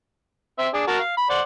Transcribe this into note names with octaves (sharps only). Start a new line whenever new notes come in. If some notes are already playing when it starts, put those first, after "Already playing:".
C4 E5
D4 G#4
F#4 A#4 A5
F5
B5
C5 D5 F#5